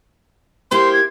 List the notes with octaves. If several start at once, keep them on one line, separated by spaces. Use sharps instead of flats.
A#3 E4 G4 C5 C6
G#6